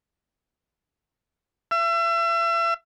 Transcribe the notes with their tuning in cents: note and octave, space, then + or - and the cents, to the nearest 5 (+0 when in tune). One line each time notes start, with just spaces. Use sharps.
E5 +35